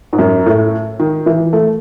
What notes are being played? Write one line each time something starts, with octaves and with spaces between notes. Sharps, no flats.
G#2
F#2
A2
D#3
E3
A3